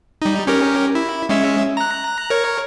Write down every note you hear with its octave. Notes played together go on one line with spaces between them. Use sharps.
G3 D#4
C#4 G4 A#4
E4
G#3 C#4 E5
A#5 F#6
A#4 C#5